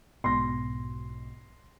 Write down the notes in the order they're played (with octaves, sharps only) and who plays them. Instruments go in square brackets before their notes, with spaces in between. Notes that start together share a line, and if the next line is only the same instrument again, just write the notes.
[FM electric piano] B1 G#2 B2 [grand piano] C6 A#6